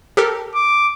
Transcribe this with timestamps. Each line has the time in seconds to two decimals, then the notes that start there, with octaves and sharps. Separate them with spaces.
0.17 G4 A4 A#4
0.55 D6